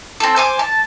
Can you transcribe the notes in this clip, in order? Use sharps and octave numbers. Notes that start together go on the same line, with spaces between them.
C4 A4
C5 G#5 D6
A5